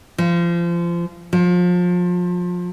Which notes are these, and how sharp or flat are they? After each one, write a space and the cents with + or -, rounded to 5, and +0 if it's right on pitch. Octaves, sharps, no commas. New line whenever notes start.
F3 -25
F3 +30